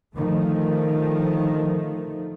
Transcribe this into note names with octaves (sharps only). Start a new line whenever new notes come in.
D3 D#3 F3 A3